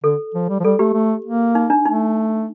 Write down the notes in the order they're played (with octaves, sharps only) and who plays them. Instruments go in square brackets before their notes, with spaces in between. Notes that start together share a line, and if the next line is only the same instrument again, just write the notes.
[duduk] D3 [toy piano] A4
[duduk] F3
G3
F3
[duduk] G3 [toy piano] A4
[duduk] A3 [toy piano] G4
[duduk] A3
A#3
[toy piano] D#4
D4
[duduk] A3 [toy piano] D#4